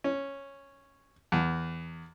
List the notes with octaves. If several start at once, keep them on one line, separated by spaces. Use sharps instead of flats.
C#4
E2